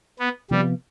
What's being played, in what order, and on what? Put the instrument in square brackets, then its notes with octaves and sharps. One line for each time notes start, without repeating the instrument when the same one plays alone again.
[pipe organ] B3
[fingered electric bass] C3 F3 B3 [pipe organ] G3